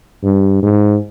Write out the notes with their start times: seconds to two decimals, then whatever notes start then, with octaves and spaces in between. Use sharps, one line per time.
0.23 G2
0.63 G#2